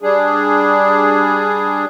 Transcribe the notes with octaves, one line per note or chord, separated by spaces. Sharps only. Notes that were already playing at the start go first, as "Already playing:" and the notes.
G3 D4 G#4